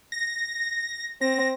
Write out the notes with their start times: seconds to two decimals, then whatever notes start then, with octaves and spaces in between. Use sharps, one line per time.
0.12 A#6
1.21 C4 A#6